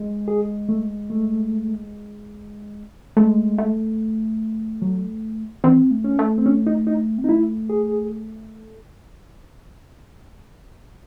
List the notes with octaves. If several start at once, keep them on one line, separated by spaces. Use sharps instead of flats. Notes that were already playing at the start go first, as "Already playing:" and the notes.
Already playing: G#3
G#4
A3
A3
G#3 A3
A3
F#3
E3 C4
A3
C#4
A3
C4
C#4
D#4
D#4
C4
D#4
A3 E4
G#4